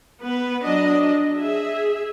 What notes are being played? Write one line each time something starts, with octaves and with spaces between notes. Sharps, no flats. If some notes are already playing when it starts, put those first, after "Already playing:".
B3 B4
F#3 D4 D#5
G#4 E5